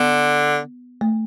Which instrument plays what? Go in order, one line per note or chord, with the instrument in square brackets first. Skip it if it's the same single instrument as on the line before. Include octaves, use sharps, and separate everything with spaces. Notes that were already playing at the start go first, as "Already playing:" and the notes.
Already playing: [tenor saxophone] D3 [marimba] B3
[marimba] A3